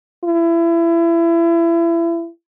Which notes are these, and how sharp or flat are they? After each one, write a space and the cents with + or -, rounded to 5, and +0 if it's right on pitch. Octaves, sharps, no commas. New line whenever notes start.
E4 +30